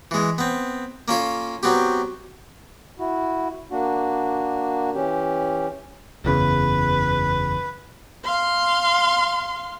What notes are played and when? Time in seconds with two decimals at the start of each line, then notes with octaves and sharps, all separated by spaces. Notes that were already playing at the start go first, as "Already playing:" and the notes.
0.11 E3 G#3
0.38 B3 C4
1.08 A#3 C#4 F4 A4
1.63 F#3 B3 C4 G4
2.99 E4 F#4
3.71 A#3 D4 F#4
4.94 E3 C#4 G4
6.25 F#1 E2 C#3 B4
8.24 F5 C6